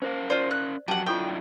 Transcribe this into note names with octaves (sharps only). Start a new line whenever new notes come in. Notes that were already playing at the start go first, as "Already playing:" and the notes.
C#4 A#4 C5 F5
F4 C5 D5
F#6
F2 F#3 G4 F#5 A5
F#2 D4 E4 F4 A4 G5 C#6